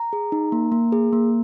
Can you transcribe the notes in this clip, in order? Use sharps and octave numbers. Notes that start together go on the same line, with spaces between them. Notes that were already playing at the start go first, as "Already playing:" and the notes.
Already playing: A#5
G#4
D#4
A#3
A#3
G#4
A#3